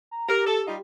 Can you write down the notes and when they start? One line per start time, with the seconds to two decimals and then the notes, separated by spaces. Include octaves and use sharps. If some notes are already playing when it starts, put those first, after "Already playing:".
0.11 A#5
0.29 G4 A#4
0.46 A4
0.67 G3 D#4 F4